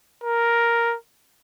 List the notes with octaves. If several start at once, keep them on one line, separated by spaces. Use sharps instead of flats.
A#4